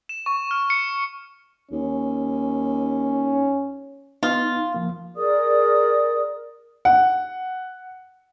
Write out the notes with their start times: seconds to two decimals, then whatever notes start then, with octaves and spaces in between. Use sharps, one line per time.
0.09 E7
0.26 C#6
0.51 F6
0.70 C#7
1.71 D#2 C#4
4.23 B3 D#4 F4
4.74 F3 A#3
5.16 G#4 A#4 D5 D#6
6.85 F#5